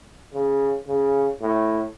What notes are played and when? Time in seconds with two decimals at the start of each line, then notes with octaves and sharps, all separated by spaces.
0.34 C#3
0.88 C#3
1.41 A2